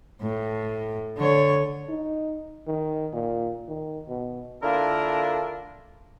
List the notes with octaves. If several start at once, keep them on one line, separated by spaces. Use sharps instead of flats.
A2
D3 C#5
D#4
D#3
A#2
D#3
B2
D3 A#3 D4 E4 F4 A#4